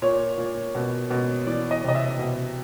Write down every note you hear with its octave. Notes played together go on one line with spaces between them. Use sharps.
A#2 C#5
A#2
B2
B2
E3 D5
D#5
C3 D#5
E5
B2